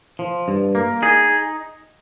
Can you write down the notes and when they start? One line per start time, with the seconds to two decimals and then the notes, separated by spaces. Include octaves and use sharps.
0.19 F3
0.48 G2
0.75 A#3
1.02 D#4 G#4